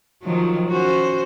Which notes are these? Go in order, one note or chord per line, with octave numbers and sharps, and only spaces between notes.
D#3 F3 F#3
C#4 F#4 C5